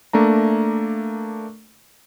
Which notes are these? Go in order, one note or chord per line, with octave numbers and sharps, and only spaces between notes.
A3 A#3 D4 A#5